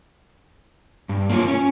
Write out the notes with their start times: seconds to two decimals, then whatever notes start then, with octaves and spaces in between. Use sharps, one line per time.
1.09 G2
1.30 A#3 D4 D#4 F4 C#5
1.48 C#4